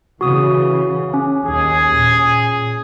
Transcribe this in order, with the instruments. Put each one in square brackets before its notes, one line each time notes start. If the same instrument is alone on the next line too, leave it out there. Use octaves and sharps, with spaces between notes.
[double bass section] C#3 E3 [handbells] F#4 D#6
[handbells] C#4
[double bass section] D#2 [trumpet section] G#4
[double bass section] A#2